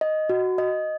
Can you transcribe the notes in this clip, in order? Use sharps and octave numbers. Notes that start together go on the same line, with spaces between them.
D#5
F#4
D#5